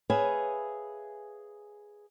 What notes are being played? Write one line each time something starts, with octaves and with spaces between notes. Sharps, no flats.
G#4 B4 C#5 E5 F5 G#5